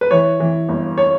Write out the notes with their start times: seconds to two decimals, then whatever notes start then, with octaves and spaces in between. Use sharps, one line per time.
0.01 B4
0.11 E3 C#5
0.40 E3
0.69 G1
0.98 C#5